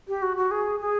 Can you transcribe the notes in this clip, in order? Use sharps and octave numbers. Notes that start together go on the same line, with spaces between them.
G4
F#4
F#4
G#4
G#4